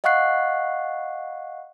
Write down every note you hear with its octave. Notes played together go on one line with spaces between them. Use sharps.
D#5 F5 F#5 C#6 F#6 C7